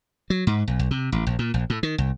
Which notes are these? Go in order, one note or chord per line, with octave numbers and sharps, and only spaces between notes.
F#3
G#2
B1
B1
C3
A1
A#1
A#2
A#1
A2
D#3
C2